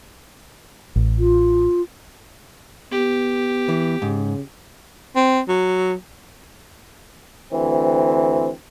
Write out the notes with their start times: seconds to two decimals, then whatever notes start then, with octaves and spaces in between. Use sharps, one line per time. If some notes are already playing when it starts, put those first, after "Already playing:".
0.96 A1
1.18 F4
2.92 B3 G4
3.69 E3
4.02 G#2 C#3
5.16 C4
5.48 F#3
7.53 D2 E3 C4